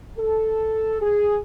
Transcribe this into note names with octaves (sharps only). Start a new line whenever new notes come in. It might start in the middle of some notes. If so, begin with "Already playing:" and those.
A4
G#4